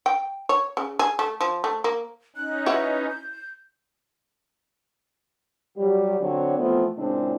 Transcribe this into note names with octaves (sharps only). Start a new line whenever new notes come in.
G5
C#5
C#3
G#4
A3
F3
A3
A#3
C#4 D#4 F#6
E4 F#4 B4 C#5
G6
F#3 G3 G4
D3 F#3 C4 D4 F#4 C#5
E3 F3 A3 B3 C4 F4
A#2 C#3 G#3 C4 D4 E4